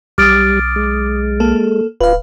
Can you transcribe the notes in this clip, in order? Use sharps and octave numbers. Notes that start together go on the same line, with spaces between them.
B1 G3 D6 D#6 F6 A6 D7
G#3
A#3 A4
D1 F4 B4 F5